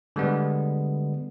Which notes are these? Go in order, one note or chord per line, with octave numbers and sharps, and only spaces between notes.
D3 G3 G#3 B3